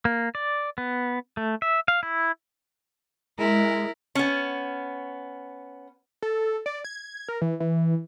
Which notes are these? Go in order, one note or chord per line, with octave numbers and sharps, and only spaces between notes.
A#3
D5
B3
A3
E5
F5
E4
G#3 E4 A#4
B3 C#4
A4
D5
G#6
A#4
E3
E3